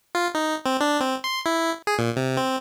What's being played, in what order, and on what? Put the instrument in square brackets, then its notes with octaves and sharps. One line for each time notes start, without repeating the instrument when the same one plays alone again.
[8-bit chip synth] F4
D#4
C4
D4
C4
C6
E4
G#4
A#2
C3
C4